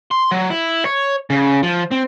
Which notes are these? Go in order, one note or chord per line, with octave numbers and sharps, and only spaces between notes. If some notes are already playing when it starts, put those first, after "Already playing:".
C6
F#3
E4
C#5
C#3
F3
C4